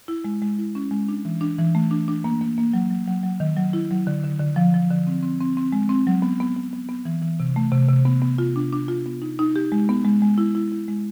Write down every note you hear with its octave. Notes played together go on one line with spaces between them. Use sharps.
E4
G#3
G#3
E4
C#4
G#3
D4
E3
D4
E3
A3
D4
D4
A#3
A#3
A#3
F#3
F#3
F#3
F#3
D#3
F#3
E4
F#3
D3
D3
D3
F3
F3
D3
C4
C4
C4
C4
G#3
C4
F#3
B3
B3
B3
B3
B3
E3
E3
C3
A3
C3
C3
B3
B3
F4
D4
D4
F4
B3
D#4
D#4
G4
G#3
B3
G#3
G#3
E4
E4
E4
G#3